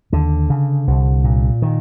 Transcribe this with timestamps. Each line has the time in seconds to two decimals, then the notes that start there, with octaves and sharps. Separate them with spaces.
0.12 D#2 D3
0.50 C#3
0.87 C2
1.24 A#2
1.62 D#3